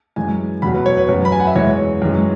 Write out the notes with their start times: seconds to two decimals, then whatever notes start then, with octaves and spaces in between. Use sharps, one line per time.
0.16 F#2 E3 G#3 G#5
0.62 E2 B2 F#3 B5
0.74 B4
0.86 C#5
0.97 B4
1.09 F#2 F#3
1.25 B5
1.32 G#5
1.40 F#5
1.47 E5
1.55 E2 E3 G#3 C#5
2.02 F#2 E3 G#3